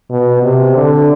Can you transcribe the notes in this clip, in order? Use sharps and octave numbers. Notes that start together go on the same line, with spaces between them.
B2
C3
D3